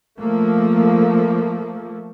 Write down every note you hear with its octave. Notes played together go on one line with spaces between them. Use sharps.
F3 A3 A#3